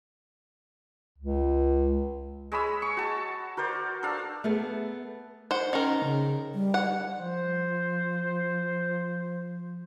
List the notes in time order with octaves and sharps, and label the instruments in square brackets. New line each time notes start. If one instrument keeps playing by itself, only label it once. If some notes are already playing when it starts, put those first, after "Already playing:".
[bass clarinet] C#2
[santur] G#3 C#5 B5 E6
C#6
F#4 A5
F#4 A#4 C5 D5
D4 A4 F5
[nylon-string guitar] A3 B3 G#4 B4
[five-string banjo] C5 F#5
[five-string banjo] D#3 A#4 [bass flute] C#4
[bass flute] C#3
G3
[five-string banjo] F#5
[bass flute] F3 [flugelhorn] C5